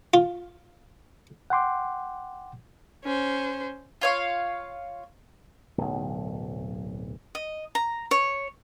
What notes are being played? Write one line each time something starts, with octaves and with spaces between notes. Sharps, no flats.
F4
F#5 G5 C6 D6
C#4 C5
F4 C#5 F5
D1 B1
D#5
A#5
C#5